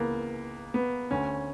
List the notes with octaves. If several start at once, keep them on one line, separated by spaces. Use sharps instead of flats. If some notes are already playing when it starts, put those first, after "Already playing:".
Already playing: C#2 C#3 E3 A#3 B3
B3
D2 D3 C#4